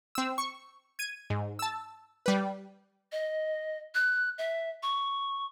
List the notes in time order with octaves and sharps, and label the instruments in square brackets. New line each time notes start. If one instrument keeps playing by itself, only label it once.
[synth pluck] C4 E6
C#6
G#6 D#7
G#2
A5 E6
G3 B4
[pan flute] D#5
F#6
E5
C#6